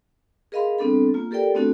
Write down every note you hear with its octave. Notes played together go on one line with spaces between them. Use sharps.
G#4 A#4 D#5 F5 B5 C6
G3 B3 C4 D4 A4 B5
A#3 F4
G4 A4 A#4 D5 G5
A3 B3 C4 D4 F#4 A4